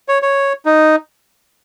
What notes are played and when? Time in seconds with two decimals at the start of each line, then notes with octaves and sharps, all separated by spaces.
0.08 C#5
0.22 C#5
0.65 D#4